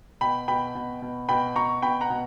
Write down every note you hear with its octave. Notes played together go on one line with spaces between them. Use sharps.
B2 G5 B5
B2 G5 B5
B2
B2
B2 G5 B5
B2 A#5 C#6
B2 G5 B5
F#5 A#5
B2